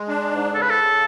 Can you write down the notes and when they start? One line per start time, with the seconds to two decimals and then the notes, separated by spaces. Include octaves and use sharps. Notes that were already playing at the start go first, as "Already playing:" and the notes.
Already playing: G#3
0.08 D4
0.31 G#2
0.54 C#3 A4
0.62 B4
0.69 A4
0.77 C#3